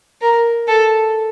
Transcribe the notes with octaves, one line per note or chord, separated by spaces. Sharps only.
A#4
A4